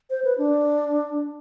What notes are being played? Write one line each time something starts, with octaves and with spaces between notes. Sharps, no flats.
C5
B4
D4